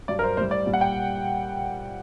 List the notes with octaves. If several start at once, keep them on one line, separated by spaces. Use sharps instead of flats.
G2 F#3 D5
A#4
C5
A2 G3 C5
D5
A#2 G3
F#5
G5